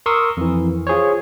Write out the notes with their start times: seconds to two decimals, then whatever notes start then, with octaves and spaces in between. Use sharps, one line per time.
0.06 A#4 C6 C#6 D#6 E6
0.37 F2 E3
0.87 F4 G#4 C5 C#5